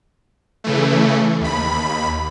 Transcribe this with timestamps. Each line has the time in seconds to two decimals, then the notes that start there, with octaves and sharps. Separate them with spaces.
0.64 C#3 E3 A3
1.41 D#2 B5